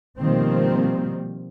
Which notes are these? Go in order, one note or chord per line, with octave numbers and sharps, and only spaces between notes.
B2 D#3 F3 G3 A#3 C4